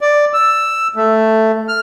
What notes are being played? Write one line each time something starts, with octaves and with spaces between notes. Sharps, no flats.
D5
E6
A3
F6